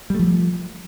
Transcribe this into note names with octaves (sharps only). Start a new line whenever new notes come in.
F3 G3 A3